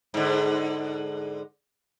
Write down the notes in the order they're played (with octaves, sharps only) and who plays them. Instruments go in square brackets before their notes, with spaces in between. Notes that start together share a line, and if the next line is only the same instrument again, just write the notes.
[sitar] G#2 D3